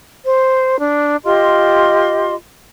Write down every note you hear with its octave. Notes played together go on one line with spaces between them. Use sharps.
C5
D4
F4 G4 D#5 C6